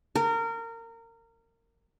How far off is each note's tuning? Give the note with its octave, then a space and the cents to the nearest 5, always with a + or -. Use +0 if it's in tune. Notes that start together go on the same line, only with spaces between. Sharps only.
A#4 -25